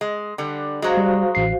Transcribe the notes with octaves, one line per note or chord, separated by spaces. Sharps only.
G#3
D3 G3
F#3 G#3 F#4 C5 F5
G3
A1 C7